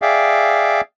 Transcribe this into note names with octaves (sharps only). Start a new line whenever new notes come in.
G#4 D5 E5 F5 G5